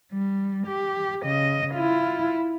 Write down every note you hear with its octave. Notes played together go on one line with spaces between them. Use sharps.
G3
G4
C#3 D#5
E4 F4